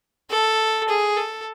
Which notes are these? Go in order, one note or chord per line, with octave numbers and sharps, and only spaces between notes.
A4
G#4
A4